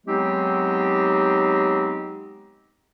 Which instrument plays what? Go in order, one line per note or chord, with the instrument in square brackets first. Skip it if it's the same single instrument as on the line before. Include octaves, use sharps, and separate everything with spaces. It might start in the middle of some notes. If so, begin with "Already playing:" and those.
[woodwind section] F#3 G#3 B3 C4 D#4 G4